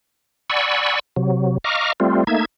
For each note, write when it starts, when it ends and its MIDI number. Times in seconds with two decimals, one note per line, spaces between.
0.50 0.99 74
0.50 0.99 78
0.50 0.99 80
0.50 0.99 83
0.50 0.99 85
0.50 0.99 88
1.16 1.58 48
1.16 1.58 54
1.64 1.93 75
1.64 1.93 77
1.64 1.93 82
1.64 1.93 85
1.64 1.93 86
1.64 1.93 89
2.00 2.24 55
2.00 2.24 57
2.00 2.24 60
2.00 2.24 65
2.27 2.45 57
2.27 2.45 58
2.27 2.45 63
2.27 2.45 76
2.27 2.45 92